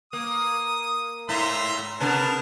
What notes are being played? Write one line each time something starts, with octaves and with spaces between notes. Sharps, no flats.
A#3 D#6
G#2 E5 A#5 C6
C3 B3 D4 A#4 A5